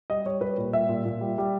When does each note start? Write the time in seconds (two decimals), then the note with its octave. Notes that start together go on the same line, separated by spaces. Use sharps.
0.10 G3 D#5
0.25 G3 C#5
0.41 G3 B4
0.58 A#2
0.73 G3 E5
0.89 A#2
1.06 A#2
1.21 G3
1.38 G3